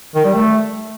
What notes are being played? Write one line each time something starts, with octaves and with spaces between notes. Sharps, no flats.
D#3
G3
A3